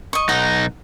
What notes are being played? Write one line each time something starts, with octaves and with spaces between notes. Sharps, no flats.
D#5 C#6
B1 D#4 F#5